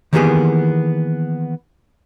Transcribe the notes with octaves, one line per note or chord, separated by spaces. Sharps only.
D#3 E3 A#3 B3 G4 G#4